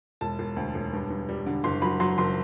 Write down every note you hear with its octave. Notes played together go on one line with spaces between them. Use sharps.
E1 A5
E1
D2
E1
G2
G2
G3
D3
F#1 C6
F#3 B5
F#3 C6
F#1 C6